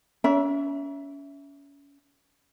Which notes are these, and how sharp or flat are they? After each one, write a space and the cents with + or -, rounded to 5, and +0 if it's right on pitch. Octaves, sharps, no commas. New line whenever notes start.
C#4 +30 E5 +0 A#5 +40